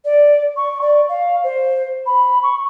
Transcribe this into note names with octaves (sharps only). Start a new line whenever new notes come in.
D5
C#6
D5
F5
C5
B5
C#6